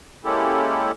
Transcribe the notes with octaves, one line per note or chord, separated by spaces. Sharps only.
G#3 A#3 C#4 E4 G4 A4